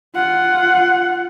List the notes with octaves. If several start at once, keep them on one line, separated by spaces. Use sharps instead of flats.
F4 F#5